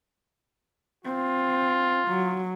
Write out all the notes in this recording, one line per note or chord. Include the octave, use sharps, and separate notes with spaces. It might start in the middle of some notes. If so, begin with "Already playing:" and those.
C4 F4
F#3